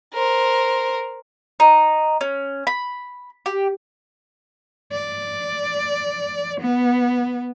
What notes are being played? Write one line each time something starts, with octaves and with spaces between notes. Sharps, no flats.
A#4 C5
D#4
C#4
B5
G4
D5
B3